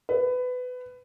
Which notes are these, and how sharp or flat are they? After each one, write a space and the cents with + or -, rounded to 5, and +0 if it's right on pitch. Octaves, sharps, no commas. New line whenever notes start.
B4 +20